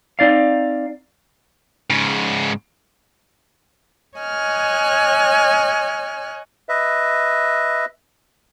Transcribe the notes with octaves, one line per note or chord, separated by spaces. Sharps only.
C4 D#4 D5 F5
G#2 C#3
C#5 D#5 G#5 F6 F#6
B4 D#5 E5